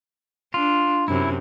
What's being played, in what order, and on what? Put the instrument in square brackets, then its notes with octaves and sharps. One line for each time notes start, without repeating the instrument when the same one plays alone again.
[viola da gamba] D4 [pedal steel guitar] F4
[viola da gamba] F#2 C3 [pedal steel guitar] E4